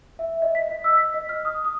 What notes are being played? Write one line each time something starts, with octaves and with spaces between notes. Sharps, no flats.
E5
D#5
B6
D#5
E6
B6
D#5
F6
D#6
D#6